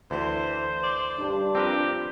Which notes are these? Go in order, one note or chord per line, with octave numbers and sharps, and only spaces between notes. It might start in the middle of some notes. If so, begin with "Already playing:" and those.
D2 E3 C5
D5
G2 G3 D4
F3 C4 G4 A#4 B4